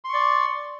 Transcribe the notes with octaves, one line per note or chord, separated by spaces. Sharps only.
D5 C6 C#6